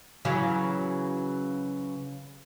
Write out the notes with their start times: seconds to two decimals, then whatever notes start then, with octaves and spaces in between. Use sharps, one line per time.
0.25 C#3 E3 F#3